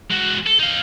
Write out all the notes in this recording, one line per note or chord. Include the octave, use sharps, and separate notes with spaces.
G#3 F#4
A4
D#4 F5